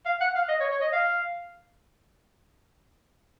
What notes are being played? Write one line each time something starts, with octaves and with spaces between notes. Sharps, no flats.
F5
F#5
F5
D#5
C#5
C#5
D#5
F5